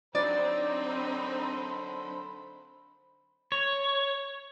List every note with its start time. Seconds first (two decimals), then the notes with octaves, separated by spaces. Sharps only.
0.15 D3 F#3 C4 D4 D#4 C5 D5 B5
3.52 C#5